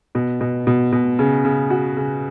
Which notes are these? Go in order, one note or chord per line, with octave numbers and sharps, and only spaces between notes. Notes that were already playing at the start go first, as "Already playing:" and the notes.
B2
B2
B2
B2
C#3
C#3
F#4
C#3